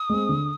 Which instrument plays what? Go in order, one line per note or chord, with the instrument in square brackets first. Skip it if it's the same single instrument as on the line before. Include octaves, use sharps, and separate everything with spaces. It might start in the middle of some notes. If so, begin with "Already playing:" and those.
Already playing: [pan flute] D#6
[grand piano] G#3 C4
D3